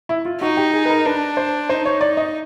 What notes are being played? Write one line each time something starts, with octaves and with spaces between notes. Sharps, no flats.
E4
F4
D#4 F#4
G4
G#4
B4
A#4
D4 B4
C5
D#4 C5
C#5
D5
D#5